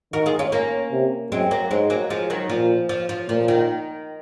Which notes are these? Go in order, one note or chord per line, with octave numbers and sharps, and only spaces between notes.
D#3 F#4 A#4
F4 G#4
C#4 F4
A#3 C#4
C3
F#2 G#3 C4
F#3 A#3
G#2 G#3 C4
F#3 A#3
F3 G#3
D#3 F#3
A#2 F3
F3
F3
A#2 F3
D#3